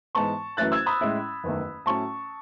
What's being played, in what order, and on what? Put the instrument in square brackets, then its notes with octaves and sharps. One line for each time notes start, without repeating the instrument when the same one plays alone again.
[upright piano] G#2 E3 G#3 B3 A5 C#6
F#2 E3 A3 C#4 E4 F#6 A6
E6 G#6
B5 D#6
A2 G#3 C#4 E4
F#1 E2 D#3 A3
A2 F#3 A3 C#4 A5 C#6